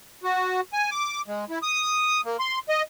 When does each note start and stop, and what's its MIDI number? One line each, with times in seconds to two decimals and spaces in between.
0.23 0.61 66
0.73 0.90 80
0.91 1.22 86
1.28 1.45 56
1.50 1.59 64
1.62 2.21 87
2.25 2.37 58
2.39 2.59 84
2.69 2.82 75